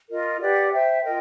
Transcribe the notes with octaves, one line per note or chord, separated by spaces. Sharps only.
F4 A#4 D#5
G4 B4 D5 F#5
C5 E5 G5
F4 A#4 D#5 G5